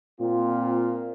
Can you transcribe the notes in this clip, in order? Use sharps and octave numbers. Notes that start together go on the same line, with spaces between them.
A#2 C4 F4